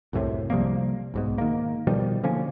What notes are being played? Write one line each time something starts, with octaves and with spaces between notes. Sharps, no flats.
C2 F#2 A2 C3
C3 F3 G3 A#3
B1 G#2 B2
D#3 A#3
B2 D#3 F3 G3
D3 F3 A#3 C#4